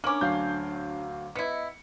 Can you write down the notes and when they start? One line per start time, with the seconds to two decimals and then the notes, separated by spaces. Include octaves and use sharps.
0.04 A#3 C#4 D4 D6 F#7
0.21 D2 F#3 F5 G6 C7
1.36 B3 E4 D#5 C#7